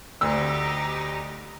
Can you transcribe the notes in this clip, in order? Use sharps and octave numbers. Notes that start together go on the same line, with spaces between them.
D2 D#4 G4 E6